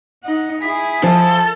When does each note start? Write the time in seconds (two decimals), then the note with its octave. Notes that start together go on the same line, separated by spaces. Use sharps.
0.23 D#4 F#5
0.62 E4 G#4 B6
1.03 F3 A4